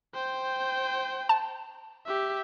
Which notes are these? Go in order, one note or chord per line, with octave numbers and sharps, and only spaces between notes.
C5 G5
A5
G4 E5